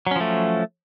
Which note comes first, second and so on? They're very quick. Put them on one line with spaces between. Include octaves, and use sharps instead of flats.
F#3 C#4 F3 A3